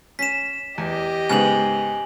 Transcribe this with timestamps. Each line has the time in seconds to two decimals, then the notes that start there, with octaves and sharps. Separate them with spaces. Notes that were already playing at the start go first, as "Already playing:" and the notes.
0.19 C#4 B6 E7
0.78 E2 G4 D#5
1.29 G#2 C#3 B3 G#5 F#7